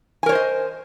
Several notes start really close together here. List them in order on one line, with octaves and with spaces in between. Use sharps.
G#5 A#4 C#5 C5 D#5